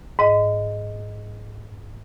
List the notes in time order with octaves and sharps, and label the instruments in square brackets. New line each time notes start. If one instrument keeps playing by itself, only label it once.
[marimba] G#2 D#5